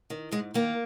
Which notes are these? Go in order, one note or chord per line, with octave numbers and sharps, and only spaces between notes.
D#3
G#2 G#3
D#3 A#3